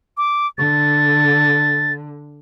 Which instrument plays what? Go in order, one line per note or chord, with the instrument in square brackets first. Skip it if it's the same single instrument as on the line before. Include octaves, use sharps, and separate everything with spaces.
[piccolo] D6
[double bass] D3 [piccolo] A6